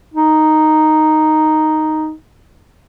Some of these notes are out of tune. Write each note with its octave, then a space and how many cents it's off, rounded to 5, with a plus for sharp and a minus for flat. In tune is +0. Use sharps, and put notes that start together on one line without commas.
D#4 -5